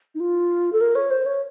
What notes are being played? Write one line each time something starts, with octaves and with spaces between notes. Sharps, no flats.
D#4
F4
A4
A#4
C#5
C5
C#5